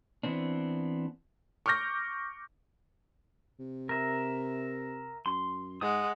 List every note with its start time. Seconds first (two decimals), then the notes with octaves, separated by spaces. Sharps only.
0.23 E3 B3 C4 D4
1.66 C#6 D6 F6 G6 A#6
3.59 C3
3.89 A#4 E5
5.26 F#2 C6
5.81 G#2 G#3 F#5 D#6